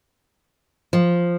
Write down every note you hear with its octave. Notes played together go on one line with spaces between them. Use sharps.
F3